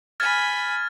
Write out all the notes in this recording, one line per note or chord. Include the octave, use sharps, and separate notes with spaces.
G#5 B5 F6 G#6 A6